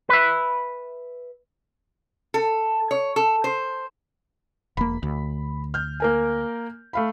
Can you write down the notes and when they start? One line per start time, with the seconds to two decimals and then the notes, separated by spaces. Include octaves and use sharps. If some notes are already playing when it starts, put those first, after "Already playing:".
0.09 B4 E5
2.34 A4
2.91 C#5
3.16 A4
3.44 C5
4.77 E1 A#3 B5
5.03 D2
5.74 F6 G6
6.00 A#3 A#4 G#5
6.93 A3 F5 B5